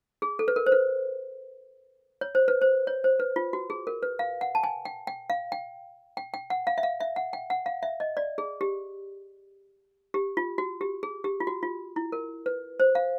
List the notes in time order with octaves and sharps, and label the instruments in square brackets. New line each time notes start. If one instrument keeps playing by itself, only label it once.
[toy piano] G#4
A4
B4
A#4
C5
B4
C#5
C5
B4
C5
C#5
C5
B4
F4
F#4
G#4
A#4
B4
F5
F#5
A5
G#5
G5
G5
F5
G5
G5
G5
F#5
F5
E5
F5
E5
F#5
G5
F#5
F5
E5
D#5
D5
G#4
G4
G4
F4
F#4
G4
G#4
G4
F4
F#4
F4
E4
A#4
B4
C5
F5